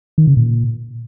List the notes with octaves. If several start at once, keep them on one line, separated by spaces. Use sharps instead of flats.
D#3
C#3
A#2